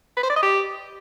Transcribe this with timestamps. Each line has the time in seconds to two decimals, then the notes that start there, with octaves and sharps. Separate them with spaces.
0.17 B4
0.23 C5
0.30 D5
0.36 D#5
0.43 G4